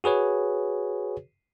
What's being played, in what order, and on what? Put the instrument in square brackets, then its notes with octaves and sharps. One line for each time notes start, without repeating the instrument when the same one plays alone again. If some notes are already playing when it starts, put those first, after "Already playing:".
[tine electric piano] F#4 G#4 B4 C#5